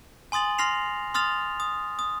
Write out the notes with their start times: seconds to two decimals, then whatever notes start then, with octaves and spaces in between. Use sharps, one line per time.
0.32 G#5 C6 D#6 A6 F#7
0.58 C6 F6 A#6 C7 F7
1.14 C6 D#6 F6 A6 F7
1.60 D#6
1.99 D#6